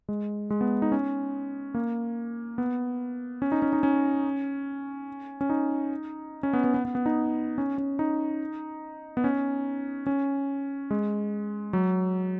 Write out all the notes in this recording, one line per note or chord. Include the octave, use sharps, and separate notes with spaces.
G#3
G#3
B3
D#4
C#4
A#3
B3
C#4
D#4
C#4
D#4
C#4
C#4
D#4
C#4
B3
B3
B3
B3
B3
D#4
C#4
C#4
D#4
B3
C#4
C#4
G#3
F#3